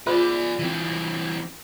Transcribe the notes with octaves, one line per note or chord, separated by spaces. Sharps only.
F4 G#4 C5 D5 C6
E3 C4